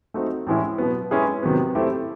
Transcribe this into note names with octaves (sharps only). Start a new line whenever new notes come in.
A3 C4 D#4 F#4
A2 E3 G#3 C#4 E4
B2 F#3 B3
G#3 C#4 E4 G#4 B4
C3 D#3 F#3 B3
A3 C4 E4 G4